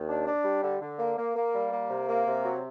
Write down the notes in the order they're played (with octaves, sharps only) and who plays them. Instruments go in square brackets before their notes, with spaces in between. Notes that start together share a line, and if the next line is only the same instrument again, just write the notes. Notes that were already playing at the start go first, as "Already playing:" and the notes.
Already playing: [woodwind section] D#2
D4
D4
G3
D3
D3
A#3
A#3
A#3
G3
A#3
C3
A#3
C3
F#3